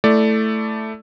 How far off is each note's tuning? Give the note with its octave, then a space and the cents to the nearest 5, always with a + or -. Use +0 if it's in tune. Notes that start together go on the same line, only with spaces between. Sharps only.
A3 +0 E4 +0 D5 +0